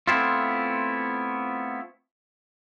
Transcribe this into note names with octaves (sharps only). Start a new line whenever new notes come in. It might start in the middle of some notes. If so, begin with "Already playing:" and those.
A3 B3 C4 E4 F4